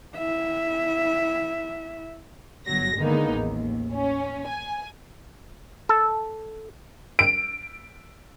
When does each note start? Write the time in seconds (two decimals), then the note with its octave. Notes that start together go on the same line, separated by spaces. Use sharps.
0.15 E4 E5
2.67 G1 F#3 A#6
2.98 D3 D#3 G#3 A#3 B3 D#4
3.32 A1 D#2
3.92 C#4
4.47 G#5
5.89 A4
7.19 D7